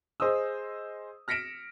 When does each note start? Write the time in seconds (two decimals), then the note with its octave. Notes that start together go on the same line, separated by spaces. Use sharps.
0.20 G#4 C5 D#5 D#6 E6
1.28 F6 A#6 B6 C#7 D7 E7